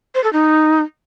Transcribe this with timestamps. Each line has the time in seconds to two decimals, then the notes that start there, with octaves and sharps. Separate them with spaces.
0.15 C5
0.24 A4
0.33 D#4